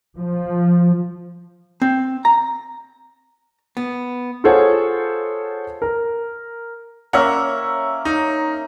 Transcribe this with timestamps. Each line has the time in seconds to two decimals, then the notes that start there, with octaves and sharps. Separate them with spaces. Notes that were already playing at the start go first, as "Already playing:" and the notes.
0.18 F3
1.82 C4
2.25 A#5
3.77 B3
4.44 F4 G#4 A4 C5 C#5 F#5
5.82 A#4
7.13 A#3 C#4 A#4 E5 F#5
8.05 D#4